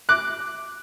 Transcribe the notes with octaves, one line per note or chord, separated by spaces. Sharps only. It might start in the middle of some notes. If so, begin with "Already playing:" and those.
D6 F#6